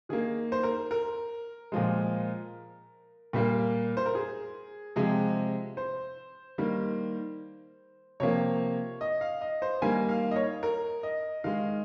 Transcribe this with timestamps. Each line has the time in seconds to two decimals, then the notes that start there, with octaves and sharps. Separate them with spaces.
0.09 D#3 A#3 G#4
0.52 C5
0.63 A#4
0.91 A#4
1.72 A#2 F3 G#3
3.33 A#2 G3 A#3
3.97 C5
4.06 A#4
4.15 G#4
4.96 C3 F3 G#3 G#4
5.77 C5
6.58 D#3 G3 A#3
8.20 C3 F3 A#3 C#5
9.01 D#5
9.21 F5
9.41 D#5
9.62 C5
9.82 D#3 G3 A#3 G#5
10.09 F5
10.31 D#5
10.36 C#5
10.63 A#4
11.03 D#5
11.44 D#3 G#3 F5